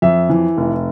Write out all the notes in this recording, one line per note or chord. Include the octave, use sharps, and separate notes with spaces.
F2 E5
E3
F1